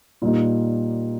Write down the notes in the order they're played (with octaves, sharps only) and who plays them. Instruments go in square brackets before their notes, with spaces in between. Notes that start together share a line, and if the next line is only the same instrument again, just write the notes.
[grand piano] A#2 G3 A#3 D#4